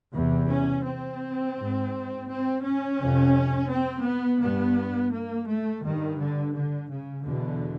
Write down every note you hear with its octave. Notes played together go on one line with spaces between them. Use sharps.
E2 C3
C#4
C4
G#2
C4
C#4
F2 C3
C4
B3
G2 B3
A#3
A3
G2 D#3
D3
D3
C#3
E2 B2 D3